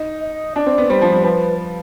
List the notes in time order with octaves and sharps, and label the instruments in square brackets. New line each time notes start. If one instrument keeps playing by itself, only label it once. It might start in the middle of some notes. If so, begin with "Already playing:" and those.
Already playing: [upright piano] D#4
[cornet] D#5
[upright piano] D4 [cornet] D5
[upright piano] C4
B3
[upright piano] G3 [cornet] C5
[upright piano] F3
G3
[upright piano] F3 [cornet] B4